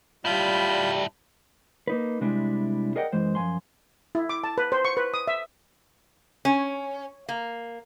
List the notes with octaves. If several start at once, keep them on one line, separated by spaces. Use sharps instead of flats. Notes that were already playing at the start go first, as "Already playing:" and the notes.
G3 D4 E4 F4 B5 G6
A#3 D#4 B4
C3 G3 G#3 D4 E4
G#4 A#4 D5 D#5 F#5 G5
F#2 E3 G#3 C5
F#2 F3 G#5 C6
E4
D6
A5
B4
C5
C#6
B4
D#6
E5
C#4
A#3